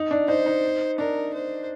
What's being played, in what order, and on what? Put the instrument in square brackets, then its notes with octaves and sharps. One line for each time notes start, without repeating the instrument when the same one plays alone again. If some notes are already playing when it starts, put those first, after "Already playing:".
Already playing: [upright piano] D#4
D4
[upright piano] D#4 [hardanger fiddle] C5
[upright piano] D#4
[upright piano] D4 [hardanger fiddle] A#4
[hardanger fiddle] C5